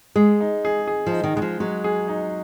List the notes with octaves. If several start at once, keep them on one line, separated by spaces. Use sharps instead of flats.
G#3 G#4
D#4
G#4
G#4
F3
D#4
D#3
D#3 G#3
F3
F#3 G#3
G#4
D#4